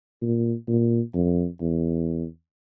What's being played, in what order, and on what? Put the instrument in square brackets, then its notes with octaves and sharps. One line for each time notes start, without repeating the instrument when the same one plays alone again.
[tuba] A#2
A#2
F2
E2